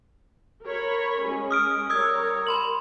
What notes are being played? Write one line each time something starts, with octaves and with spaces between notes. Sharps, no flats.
A#4 C#5 B5
G#3 C#4
D#6 F6 D7
G3 A#4 C#5 D#6 E6 G#6
B5 C6 F#7